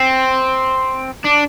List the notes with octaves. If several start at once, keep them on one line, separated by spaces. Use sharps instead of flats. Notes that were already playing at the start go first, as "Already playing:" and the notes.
Already playing: C4
D4